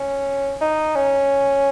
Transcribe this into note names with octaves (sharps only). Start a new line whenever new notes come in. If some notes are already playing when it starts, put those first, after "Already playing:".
Already playing: C#4
D#4
C#4